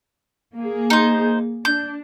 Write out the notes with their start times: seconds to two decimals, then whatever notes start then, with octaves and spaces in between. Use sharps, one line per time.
0.57 A#3 G#4
0.90 D#4 C5
1.65 D4 G6